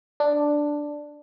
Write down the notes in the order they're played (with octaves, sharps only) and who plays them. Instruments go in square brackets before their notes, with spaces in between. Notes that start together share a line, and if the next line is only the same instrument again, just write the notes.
[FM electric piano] D4